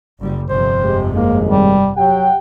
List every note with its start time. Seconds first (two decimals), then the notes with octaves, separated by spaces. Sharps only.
0.21 F#1 G3
0.49 G1 F2 C3 C5
0.83 G#3 G4
1.13 G#1 D#2 G#3 A#3
1.49 G3
1.96 F#3 G4 F#5 G5